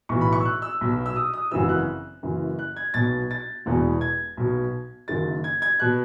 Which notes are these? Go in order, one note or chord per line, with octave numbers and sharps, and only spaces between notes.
B1 A2 E3 C#6
B5
C#6
E6
F#6
E6
B1 B2
E6
D#6
D#6
G#1 F#2 C#3 E3 E6
F#6
F#1 F#2 E3
F#6
G#6
B1 B2 A6
A6
E1 E2 B2
G#6
B1 B2
F#1 F#2 D#3 A6
G#6
G#6
B2 F#6